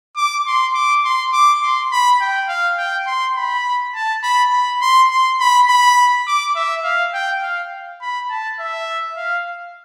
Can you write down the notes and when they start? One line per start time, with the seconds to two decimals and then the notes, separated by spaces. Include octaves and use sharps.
0.17 D6
0.47 C6
0.74 D6
1.05 C6
1.32 D6
1.61 C6
1.92 B5
2.21 G5
2.49 F5
2.78 G5
3.07 C6
3.36 B5
3.95 A5
4.23 B5
4.52 B5
4.82 C6
5.10 C6
5.40 B5
5.68 B5
6.27 D6
6.56 E5
6.84 F5
7.14 G5
7.43 F5
8.01 B5
8.30 A5
8.59 E5
9.16 F5